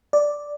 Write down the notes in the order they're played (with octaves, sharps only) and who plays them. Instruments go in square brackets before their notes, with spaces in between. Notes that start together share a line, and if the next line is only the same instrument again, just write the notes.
[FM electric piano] D5